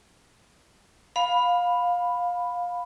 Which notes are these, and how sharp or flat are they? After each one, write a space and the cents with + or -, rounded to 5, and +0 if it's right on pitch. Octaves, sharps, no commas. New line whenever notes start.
F5 +20 B5 +0